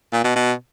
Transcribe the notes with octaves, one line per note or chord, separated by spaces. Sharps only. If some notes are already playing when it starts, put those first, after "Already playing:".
A#2
B2
B2